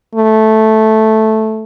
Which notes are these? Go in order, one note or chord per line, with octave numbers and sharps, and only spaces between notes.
A3